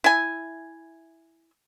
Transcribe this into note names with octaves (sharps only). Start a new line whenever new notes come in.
E4 G#5